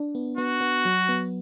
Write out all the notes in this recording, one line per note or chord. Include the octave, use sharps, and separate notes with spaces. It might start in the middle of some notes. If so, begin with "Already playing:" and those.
Already playing: D4
B3
B3 F#4
B3
F#3
B3